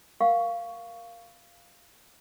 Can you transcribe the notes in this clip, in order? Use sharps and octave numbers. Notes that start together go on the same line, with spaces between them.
A#4 F5 F#5 C#6